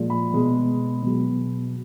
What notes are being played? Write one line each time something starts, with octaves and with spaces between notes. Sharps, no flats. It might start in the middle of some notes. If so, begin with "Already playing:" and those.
Already playing: A#2 F3 G#3
B5
B2 G#3
B2 F#3